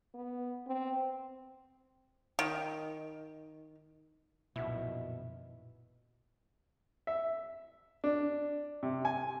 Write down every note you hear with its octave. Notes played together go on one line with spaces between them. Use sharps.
B3
C4
D#3
A#1 F#2 B2 D#3 E4 F4 F#5
E5
D4
C3
G#5